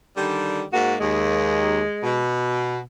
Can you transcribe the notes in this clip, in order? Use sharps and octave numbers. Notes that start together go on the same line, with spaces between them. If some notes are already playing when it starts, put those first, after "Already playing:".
D3 D#3 G3
G#2 A#3 F#4
D#2 G#3
B2